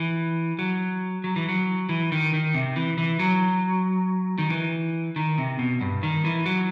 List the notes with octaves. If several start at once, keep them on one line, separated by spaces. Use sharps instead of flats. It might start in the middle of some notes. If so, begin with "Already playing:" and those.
Already playing: E3
F#3
F#3
E3
F#3
E3
D#3
D#3
C3
E3
E3
F#3
D#3
E3
D#3
C3
B2
G2
D#3
E3
F#3